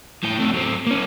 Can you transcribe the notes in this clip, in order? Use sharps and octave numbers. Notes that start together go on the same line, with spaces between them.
A2 G5
C3 A3
F#3 C4
A#3 C#4